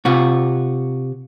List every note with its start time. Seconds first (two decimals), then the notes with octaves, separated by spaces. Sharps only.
0.05 C3 F4 F#4